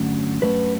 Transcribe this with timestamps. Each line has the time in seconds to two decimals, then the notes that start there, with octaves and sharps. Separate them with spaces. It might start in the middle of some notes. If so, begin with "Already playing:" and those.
Already playing: G2 D3 F#3 A3 C#4
0.42 G2 F#3 A3 C#4 B4